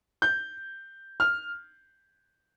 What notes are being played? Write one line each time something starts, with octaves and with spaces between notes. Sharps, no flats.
G6
F6